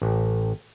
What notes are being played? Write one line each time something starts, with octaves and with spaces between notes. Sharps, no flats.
A1